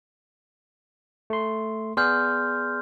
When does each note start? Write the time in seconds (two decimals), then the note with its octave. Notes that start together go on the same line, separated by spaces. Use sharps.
1.30 A3 C6
1.97 B3 G#4 D5 C6 F6 G6